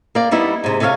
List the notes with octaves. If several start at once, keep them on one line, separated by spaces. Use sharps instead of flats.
A#3 D5
G3 B3 D#4 E4
G#2 C3
C3 A4 C#5 E5 F5